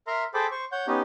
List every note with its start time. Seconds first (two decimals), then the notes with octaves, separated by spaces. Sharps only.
0.07 A#4 E5 A#5 C6
0.34 G#4 A4 C5 G5 B5 D6
0.51 C5 C#6
0.72 C#5 F#5 G6
0.87 B3 C#4 D#4 G4